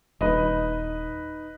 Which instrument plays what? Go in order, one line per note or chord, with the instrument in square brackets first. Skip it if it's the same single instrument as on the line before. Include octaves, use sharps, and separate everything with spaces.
[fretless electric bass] D#1 [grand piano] D#4 B4 D#5